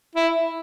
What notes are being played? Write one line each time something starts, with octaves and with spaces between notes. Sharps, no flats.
E4